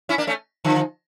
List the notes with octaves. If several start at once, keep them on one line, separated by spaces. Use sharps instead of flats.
C#4 E4
A#3 D4
A3 C#4
D3 F3